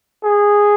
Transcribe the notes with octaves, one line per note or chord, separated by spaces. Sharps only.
G#4